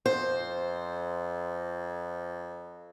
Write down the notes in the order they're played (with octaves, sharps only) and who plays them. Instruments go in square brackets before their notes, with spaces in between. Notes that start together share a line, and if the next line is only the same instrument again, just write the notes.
[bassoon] F2 [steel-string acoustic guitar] C5